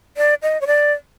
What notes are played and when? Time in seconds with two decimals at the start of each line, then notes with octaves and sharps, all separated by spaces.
0.17 D5
0.42 D#5
0.61 C#5
0.67 D5